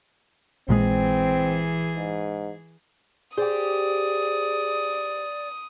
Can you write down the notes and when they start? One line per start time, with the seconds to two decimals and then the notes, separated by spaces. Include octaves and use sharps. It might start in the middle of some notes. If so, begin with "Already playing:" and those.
0.69 A#1 A#2 E3 G#3 C4 G#4
1.96 G#2
3.37 G4 G#4 C5 D5 D#6